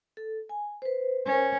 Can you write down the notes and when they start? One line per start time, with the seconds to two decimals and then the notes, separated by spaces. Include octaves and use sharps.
0.17 A4
0.49 G#5
0.82 B4 C5
1.26 C#4 A#4 C5